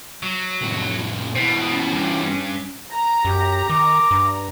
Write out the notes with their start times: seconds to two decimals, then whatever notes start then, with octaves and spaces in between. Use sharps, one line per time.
0.23 F#3
0.62 F2 A2
1.36 B2 E3 C4
1.73 C#4
1.92 B1 G2
2.92 A#5
3.25 F#2 G4
3.70 D#3 D6
4.11 G2